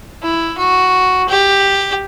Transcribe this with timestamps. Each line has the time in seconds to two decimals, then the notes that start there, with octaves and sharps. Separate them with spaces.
0.22 E4
0.58 F#4
1.29 G4